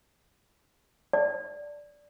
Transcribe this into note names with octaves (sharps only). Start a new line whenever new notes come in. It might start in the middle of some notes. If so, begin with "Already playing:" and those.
D5